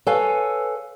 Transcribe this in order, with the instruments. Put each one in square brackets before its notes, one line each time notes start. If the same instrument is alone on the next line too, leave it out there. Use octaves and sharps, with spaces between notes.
[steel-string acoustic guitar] A4 B4 C#5 F5 G#5